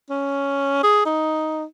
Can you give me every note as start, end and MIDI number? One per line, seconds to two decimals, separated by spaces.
0.10 0.82 61
0.83 1.01 68
1.05 1.64 63